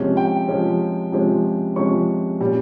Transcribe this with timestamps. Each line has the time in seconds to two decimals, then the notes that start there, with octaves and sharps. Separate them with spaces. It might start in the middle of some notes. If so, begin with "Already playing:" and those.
Already playing: C3 F3 G#3 C#4
0.17 G5
0.48 C3 F3 G#3 C#4
1.12 C3 F3 G#3 C#4
1.76 C3 F3 G#3 C#4 C#6
2.40 A#2 G3 C#4